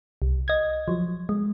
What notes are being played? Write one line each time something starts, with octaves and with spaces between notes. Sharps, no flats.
C2
D#5 G#6
F3 F#3
G#3